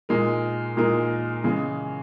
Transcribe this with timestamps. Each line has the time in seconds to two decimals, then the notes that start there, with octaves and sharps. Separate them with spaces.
0.09 A#2 G#3 D#4 A#4
0.77 A#2 G#3 D#4 A#4
1.44 C#3 E3 G#3